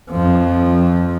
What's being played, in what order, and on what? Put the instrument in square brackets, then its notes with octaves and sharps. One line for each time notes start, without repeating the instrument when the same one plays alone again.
[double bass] F2 F3